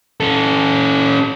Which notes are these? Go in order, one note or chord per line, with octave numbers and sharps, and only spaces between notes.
C#4 A4